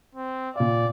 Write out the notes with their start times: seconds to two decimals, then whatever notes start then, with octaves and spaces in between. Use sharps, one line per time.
0.15 C4
0.56 A#2 D5 F5